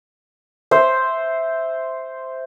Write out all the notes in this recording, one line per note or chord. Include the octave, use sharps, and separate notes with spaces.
C5 E5